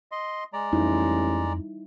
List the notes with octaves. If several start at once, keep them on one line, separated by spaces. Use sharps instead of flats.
D#5 C6
G#3 D5 A#5
A1 F2 G3 D#4 E4